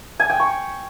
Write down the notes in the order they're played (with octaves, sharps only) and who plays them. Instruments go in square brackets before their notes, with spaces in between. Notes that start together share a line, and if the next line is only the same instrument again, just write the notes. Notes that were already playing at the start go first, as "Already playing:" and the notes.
[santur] G#5
G5
C#6